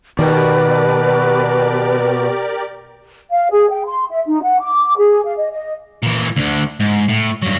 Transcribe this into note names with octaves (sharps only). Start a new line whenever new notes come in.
B2 D#3 G4 A#4 B4 D5
F5
G#4
G5
C6
E5
D#4
F#5
D6
G#4
F5
D#5
D#5
A#2 E3
D2 D3
G#2
A2
G2 F#3